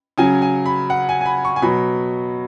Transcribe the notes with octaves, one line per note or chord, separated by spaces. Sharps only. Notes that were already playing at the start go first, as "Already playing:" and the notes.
C#3 F#3 G#5
G#5
B5
F#5
G#5
G#5
B5
C#6
G#5
B2 F#3 B5